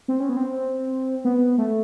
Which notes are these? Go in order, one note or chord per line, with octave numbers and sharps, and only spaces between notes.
C4
C#4
B3
C4
B3
A3